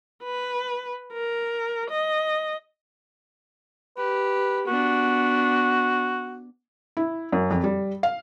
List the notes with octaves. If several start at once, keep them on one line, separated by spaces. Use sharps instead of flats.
B4
A#4
D#5
G4 B4
B3 D4 F#4
E4
F#2
F2
G3
F5